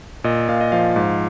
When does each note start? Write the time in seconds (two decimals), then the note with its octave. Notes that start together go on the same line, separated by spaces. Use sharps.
0.24 A#2 D#5
0.49 A#2 F5
0.61 D#5
0.72 F3 F5
0.96 G#2